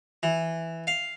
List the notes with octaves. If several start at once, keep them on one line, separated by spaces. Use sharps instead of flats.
E3
F5